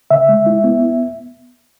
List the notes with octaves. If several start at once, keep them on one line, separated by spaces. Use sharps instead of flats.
C#3 E5
G#3
E4
B3